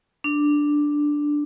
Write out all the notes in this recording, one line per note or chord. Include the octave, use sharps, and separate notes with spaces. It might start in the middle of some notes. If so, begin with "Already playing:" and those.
D4